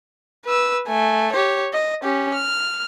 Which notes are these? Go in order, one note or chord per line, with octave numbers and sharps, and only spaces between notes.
B4 E6
A3 G#5
G4 C#5
D#5
C#4 G4
F6